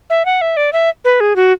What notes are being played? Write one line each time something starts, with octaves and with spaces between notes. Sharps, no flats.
E5
F#5
E5
D5
E5
B4
G#4
F#4